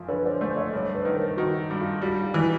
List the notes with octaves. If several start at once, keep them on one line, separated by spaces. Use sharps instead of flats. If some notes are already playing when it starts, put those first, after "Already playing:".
Already playing: F#2 F3
D3 B4 C#5
C5 D5
A3 C5 D5
C#5 D#5
G2 C5 D5
B4 C#5
D#3
A#4 C5
D#3 F#4
G2
F4
G3 F#4
F4 G4
E3